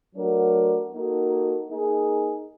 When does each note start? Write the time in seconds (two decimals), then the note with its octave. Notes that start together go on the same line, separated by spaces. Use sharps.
0.16 F#3 A3 D4 F#4 A#4
0.93 A#3 D#4 F#4 A4
1.70 A#3 D#4 G#4